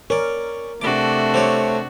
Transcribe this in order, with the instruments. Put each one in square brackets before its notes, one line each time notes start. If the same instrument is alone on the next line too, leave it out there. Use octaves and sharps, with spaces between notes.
[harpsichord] C#4 D5 [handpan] A#4
[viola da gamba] C3 D4 F#4 [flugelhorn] A3 [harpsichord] D6
[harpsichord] C4 G4 C#5